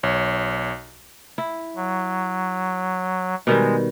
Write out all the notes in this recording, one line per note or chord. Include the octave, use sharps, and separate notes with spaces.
B1 C#5
E4
F#3
B2 D#3 G3 G#3